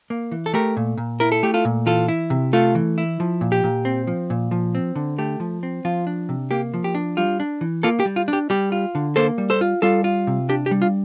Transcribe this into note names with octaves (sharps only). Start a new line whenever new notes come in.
A#3
E3
A4
A3 G4 A#4
A#2
A#2
E4 A#4
A4
A3 G4
F4 A4
A#2
E3 F4 A4
E4
C3
A3 F4 A4
E3
E4
F3
A#2
G4
A#2
C4
F3
A#2
F3
C4
D3
A3 G4
F3
C4
F3 F4
D4
C3
A#3 G4
F3
G4
D4
G3 F4
D4
E3
A#3 F4 A4
G4
G3
F4
D4
G4
G3 G4
F4
D3
A#3 A4 C5
G3
A4 C5
F4
G3 F4 A4
F4
C3
D4 G4
G4
G3
F4